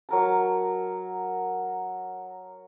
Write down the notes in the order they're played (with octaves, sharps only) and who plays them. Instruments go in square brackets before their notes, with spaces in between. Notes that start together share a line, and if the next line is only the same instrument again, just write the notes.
[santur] F#3 A#4 A5